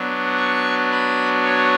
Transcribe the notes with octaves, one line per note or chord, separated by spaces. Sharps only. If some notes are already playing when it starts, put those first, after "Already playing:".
Already playing: F#3 B3 D4
C#6
B5
C#5